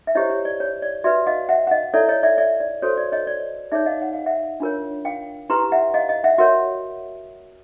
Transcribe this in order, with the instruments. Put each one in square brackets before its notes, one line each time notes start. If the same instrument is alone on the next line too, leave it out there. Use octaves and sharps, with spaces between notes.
[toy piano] E5
E4 G4 C5 C#5 D#5
C#5
D5
C#5
D5
F#4 B4 D5 E5
D#5 F5
E5 F#5
F#5
D#5 F5
E4 A4 C#5 D5 E5
C#5 D#5
D5 E5
D5 E5
D5
F#4 A4 C5 C#5
D5
C#5 D#5
D5
D#4 G#4 C#5 D5 E5
D#5 F5
F#5
F5
E5 F#5
D4 F4 A#4 C#5
F5 G5
E4 G4 B4 A#5 C6
E5 F#5
D#5 F5
D#5 F5
E5 F#5
F#4 A#4 C#5 E5 F#5